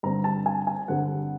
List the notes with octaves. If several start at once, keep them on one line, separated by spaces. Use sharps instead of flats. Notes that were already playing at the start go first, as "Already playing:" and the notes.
G2 D3 G3 C4 A#5
A5
G#5
G#5
G2 D3 G3 C4 F#5